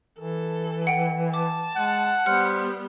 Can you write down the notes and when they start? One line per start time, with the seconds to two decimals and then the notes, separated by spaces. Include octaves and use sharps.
0.19 E3 A4
0.87 F#5 G5
1.34 A5 D6
1.76 G#3 F#5
2.26 G3 B3 C5 F6 C#7